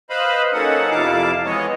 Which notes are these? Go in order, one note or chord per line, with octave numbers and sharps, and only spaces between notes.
B4 C5 D#5 F5 B5
F#3 A#3 C#4 D#4 A4 F#5
F2 C3 E4 F5 A5 D6
E3 G#3 B3 C#5 D#5